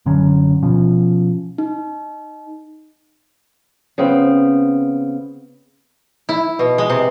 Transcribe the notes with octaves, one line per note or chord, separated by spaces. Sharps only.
F#1 D3 F#3 C#4
B2 F3 C#4
D#4
C#3 B3 C4
E4
B2
G#3
C3